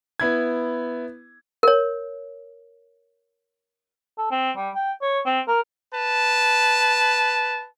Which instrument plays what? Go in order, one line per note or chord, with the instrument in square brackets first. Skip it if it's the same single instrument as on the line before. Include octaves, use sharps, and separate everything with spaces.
[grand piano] B3 E4 G#6
[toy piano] A#4 C#5
[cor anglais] A4
C4
G3
G5
C#5
C4
A#4
[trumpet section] B4 A5